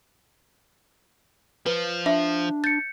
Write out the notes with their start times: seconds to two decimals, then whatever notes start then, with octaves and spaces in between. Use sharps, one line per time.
1.66 F3 B4
2.06 D4 E5
2.64 G6 A6 C#7